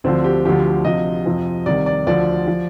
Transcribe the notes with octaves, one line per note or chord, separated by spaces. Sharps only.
D2 D3 F3 C4
G4
D2 D3 F3 G4
D2 C3 F3 D#5
F2 C3 F3
C2 C3 D#3 D5
D5
D2 D3 F3 D5
F3